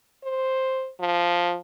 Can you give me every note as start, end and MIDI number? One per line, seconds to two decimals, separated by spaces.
0.24 0.90 72
1.00 1.57 53